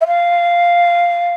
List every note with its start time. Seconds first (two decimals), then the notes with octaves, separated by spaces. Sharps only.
0.01 E5
0.07 F5